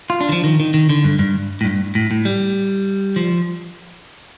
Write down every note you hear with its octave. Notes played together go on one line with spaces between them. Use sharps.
F4
D4
D#3
F3
D#3
D#3
D#3
D3
G2
G2
A2
G2
A2
A2
G3
F3